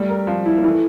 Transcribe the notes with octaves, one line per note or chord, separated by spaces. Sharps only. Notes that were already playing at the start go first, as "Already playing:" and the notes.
Already playing: G3 A3
A#4
F3
E4
A#3
E3 A3